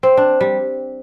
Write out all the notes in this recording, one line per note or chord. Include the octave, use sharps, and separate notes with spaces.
C4
D4
G3